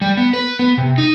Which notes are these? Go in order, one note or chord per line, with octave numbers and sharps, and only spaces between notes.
G3
B3
B4
B3
C3
D#4